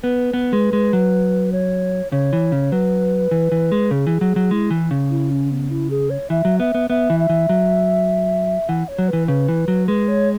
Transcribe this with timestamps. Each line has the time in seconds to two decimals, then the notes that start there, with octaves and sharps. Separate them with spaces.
0.03 B3 B4
0.33 B3
0.53 G#3
0.73 G#3
0.93 F#3
1.52 C#5
2.12 C#3 C#5
2.33 E3
2.52 C#3
2.72 F#3 B4
3.31 E3
3.52 E3
3.72 G#3
3.91 C#3 G#4
4.07 E3
4.21 F#3
4.36 F#3
4.51 G#3 E4
4.70 E3
4.91 C#3
5.10 E4
5.31 C#4
5.51 B3
5.70 E4
5.90 G#4
6.10 C#5
6.30 E3 E5
6.45 F#3
6.60 B3 E5
6.75 B3
6.90 B3 E5
7.10 E3
7.19 E5
7.29 E3
7.49 F#3
8.69 E3 F#5
8.88 C#5
8.98 F#3
9.08 E3 B4
9.28 C#3 B4
9.48 E3
9.68 F#3
9.88 G#3 B4
10.08 C#5